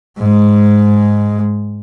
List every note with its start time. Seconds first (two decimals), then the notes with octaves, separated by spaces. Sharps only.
0.18 G#2 G#3